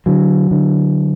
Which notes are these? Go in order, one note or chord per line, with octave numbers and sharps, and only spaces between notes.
D3 F#3
D3